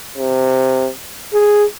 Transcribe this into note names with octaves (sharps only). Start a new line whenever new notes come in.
C3
G#4